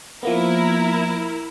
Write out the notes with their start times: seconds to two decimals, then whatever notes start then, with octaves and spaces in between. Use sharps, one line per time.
0.23 F3 A#3 B3 E4 A#4